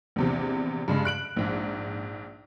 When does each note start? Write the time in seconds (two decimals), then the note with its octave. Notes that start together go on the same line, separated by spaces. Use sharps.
0.16 A#1 E2 C3
0.88 G2 C#3 G#3
1.05 F#6 D7 F#7
1.37 A#1 G#2